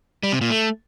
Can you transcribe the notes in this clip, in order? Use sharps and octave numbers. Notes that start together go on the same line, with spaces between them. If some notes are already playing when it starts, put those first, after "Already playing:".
G3
C3
A#2
A3